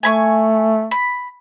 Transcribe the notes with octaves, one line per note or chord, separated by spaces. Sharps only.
A3 G#5 B5 C#6
B5